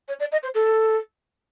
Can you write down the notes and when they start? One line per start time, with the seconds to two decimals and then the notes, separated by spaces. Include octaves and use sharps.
0.08 C#5
0.19 D5
0.32 D#5
0.43 C5
0.54 A4